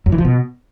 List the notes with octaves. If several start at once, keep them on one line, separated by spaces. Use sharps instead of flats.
F#2
E3
F3
B2